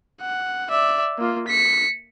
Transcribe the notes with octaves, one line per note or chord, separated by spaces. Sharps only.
F#5
D5 E5
A#3 F4
B6 C#7